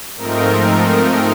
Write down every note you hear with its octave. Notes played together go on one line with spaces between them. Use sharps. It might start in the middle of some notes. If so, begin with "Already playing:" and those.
G#2 F3 A3 C4 D#4 A#4
A#4
A#4